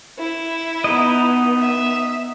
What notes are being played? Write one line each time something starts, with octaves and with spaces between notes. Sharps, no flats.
E4
B3 D#4 D#5
E5